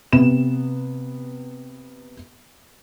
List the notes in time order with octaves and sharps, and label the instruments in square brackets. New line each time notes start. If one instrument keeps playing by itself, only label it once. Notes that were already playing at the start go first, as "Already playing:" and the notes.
[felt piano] C3 B3 E7